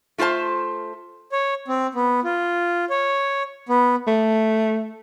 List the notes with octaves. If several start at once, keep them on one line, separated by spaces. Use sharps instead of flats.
A3 F4 A4 C5 A5
C#5
C4
B3
F4
C#5
B3
A3